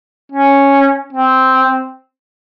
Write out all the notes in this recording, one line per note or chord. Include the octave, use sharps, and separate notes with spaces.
C#4
C4